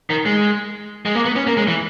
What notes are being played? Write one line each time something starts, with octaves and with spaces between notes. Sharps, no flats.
D#3
G#3
G#3
A#3
B3
C#4
A#3
G#3
E3